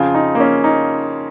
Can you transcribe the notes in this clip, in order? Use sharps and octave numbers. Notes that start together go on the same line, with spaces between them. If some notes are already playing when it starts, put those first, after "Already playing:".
Already playing: F2 C#3 F4
D#4
A#3
C#4
D#4